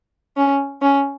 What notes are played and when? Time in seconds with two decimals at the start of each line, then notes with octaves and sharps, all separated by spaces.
0.37 C#4
0.82 C#4